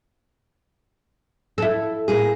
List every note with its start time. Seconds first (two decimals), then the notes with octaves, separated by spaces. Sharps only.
1.58 E4 A4
2.08 A2 A#3 G#4